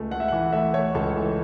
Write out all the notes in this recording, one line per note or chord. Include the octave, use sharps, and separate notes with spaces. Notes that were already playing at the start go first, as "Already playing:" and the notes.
Already playing: C#2 A3
A3 F#5
E5
E3 F#5
A3 E5
A3 C#5
C#2 A4
E3